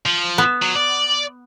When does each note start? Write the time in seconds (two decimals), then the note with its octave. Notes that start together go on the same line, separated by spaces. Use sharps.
0.06 F3
0.38 B3
0.62 F#3
0.76 D5